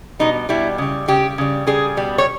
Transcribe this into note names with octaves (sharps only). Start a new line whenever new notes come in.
B2 G3 D#4
B2 G3 E4
C#3 G3
C#3 G3 G4
C#3 G3
C#3 G3 G#4
B2 G3
C#5